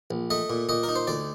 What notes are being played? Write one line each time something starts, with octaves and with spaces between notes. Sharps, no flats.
A#1
A3 D#5
A#2
A#2 D#5
A#4
D#4
C5
D2 D5